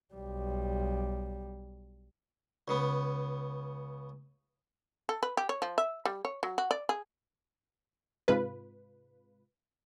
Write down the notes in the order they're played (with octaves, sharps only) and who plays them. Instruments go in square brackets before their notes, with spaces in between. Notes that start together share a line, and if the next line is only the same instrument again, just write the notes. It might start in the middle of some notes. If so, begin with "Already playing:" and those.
[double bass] B1 G3
[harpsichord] C#2 C#3 B3
[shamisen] A4
B4
G4
C#5
F3
E5
G3
C#5
F#3
F#4
D5
G#4
[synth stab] G#2 C3 G#3 F4 B4